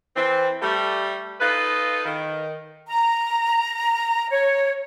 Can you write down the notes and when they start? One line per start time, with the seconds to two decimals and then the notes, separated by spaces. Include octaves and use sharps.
0.16 E3 C4
0.62 G3 A3
1.41 D#4 F4 A4 B4
2.05 D#3
2.88 A#5
4.30 C#5